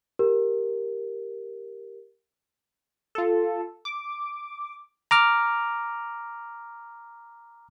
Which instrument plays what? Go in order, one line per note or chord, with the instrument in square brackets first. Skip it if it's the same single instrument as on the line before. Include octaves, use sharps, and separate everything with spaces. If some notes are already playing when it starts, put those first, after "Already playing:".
[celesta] G4 A#4
[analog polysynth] F4 A4
D6
[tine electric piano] A#5 D6 F6